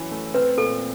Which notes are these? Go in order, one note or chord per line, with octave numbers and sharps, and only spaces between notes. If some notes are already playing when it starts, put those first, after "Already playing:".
Already playing: E3 F#3 C#4
A3
C4 B4
A#2 A4